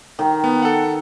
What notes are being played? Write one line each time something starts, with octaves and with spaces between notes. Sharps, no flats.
D#3 G5
B3
A4 F#5